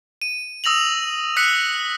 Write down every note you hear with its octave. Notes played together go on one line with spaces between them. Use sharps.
D#7
D#6 E6 A#6 F7 F#7
E6 F#6 B6 C#7